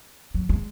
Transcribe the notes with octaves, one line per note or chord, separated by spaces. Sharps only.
F#3
G#3